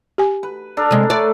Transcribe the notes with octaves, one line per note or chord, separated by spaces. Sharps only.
G4 G#5
B4
D4 A4 A#4
C3 G#3
A3 A4 B4 D5